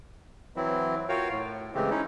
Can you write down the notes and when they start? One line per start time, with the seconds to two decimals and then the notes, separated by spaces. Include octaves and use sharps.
0.56 E3 F#3 C4 E4
1.09 F4 F#4 A#4 C#5 F5 G5
1.31 A2
1.75 C#3 E3 G#3 A3 C4 G4
1.90 C#4 D#4 E4